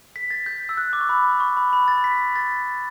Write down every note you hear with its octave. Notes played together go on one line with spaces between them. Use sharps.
B6
A6
G6
E6
F#6
D6
C#6
B5
C#6
B5
B5
A6
B6
A6